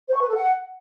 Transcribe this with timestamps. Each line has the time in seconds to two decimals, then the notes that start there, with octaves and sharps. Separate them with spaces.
0.08 C5
0.15 C#6
0.21 B4
0.28 A4
0.35 F#5